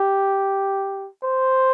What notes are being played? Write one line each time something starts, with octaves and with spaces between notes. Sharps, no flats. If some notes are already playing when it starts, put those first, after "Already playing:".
Already playing: G4
C5